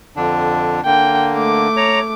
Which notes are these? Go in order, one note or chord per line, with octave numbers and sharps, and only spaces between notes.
F2 D3 D4
D3 A#3 G5
A3 D6
C#5 A#5